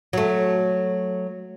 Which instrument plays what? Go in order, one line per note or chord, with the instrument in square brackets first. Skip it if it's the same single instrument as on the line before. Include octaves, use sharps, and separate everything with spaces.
[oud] F#3 A3